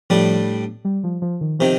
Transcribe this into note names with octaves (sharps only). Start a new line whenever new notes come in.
A2 F3 G3 D4
G3
F3
F3
D#3
C3 D#3 F3